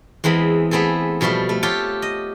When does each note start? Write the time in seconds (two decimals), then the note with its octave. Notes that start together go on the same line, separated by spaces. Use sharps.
0.24 E2 E3 G#3 C4 B5
0.71 A3 B3 C4 G#4 A4
1.21 B2 F3 G3 A3 F4
1.49 A3
1.63 F4 G4 A4 C#5
2.02 D#5